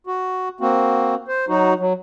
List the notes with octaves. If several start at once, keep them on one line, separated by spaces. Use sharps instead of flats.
F#4
A#3 C4 F#4
C5
F#3 D#4 F#4
F#3